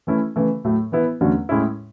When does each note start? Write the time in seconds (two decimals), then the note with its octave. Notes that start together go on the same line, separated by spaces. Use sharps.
0.07 E3 A3 C#4 E4
0.36 C#3 E3 A3
0.64 A2 F#3 A3
0.92 E3 B3 E4
1.21 E2 D3 F#3 A3 C#4
1.49 A2 G#3 C#4 E4